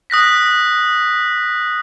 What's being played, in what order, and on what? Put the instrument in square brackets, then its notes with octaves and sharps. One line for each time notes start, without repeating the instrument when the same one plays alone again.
[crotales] D#6 F#6 A#6 B6